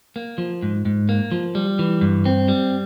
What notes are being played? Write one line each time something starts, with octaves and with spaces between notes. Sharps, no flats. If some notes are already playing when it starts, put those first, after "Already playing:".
A#3
F3
G#2
G#2
A#3
F3
G3
E3
G2
C4
G3